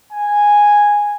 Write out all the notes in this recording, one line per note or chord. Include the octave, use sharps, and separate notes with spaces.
G#5